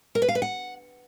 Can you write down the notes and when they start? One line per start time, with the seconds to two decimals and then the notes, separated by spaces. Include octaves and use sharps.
0.15 A#4
0.22 B4
0.28 F5
0.35 B4
0.42 F#5